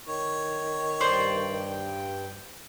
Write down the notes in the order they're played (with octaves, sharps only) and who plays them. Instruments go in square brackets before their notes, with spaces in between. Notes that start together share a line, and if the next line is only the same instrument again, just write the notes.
[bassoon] D#3 [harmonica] C#5
[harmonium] G2 G5 [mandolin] C5 D5